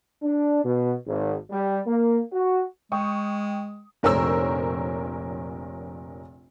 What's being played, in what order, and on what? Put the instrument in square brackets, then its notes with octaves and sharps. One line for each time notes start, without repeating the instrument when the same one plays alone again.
[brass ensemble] D4
B2
G#1
G3
A#3
F#4
[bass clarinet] G#3 [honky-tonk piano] G5 C#6 D#6
[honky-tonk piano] F1 A#1 A#4 C5 C#5 E6